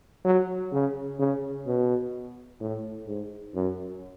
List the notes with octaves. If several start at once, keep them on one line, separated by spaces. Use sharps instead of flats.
F#3
C#3
C#3
B2
A2
G#2
F#2